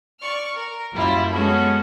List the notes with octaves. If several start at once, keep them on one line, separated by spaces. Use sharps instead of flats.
D5 C#6 F6
A#4
F#2 G3 A#3 E4 F4
G#3 B3 C#4 F#4 G#4 A4